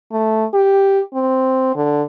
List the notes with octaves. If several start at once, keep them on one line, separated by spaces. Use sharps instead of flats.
A3
G4
C4
D3